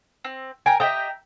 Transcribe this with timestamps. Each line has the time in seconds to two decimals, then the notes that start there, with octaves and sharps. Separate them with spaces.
0.24 C4
0.66 A#4 G5 G#5
0.80 G4 D#5 E5 G5 A#5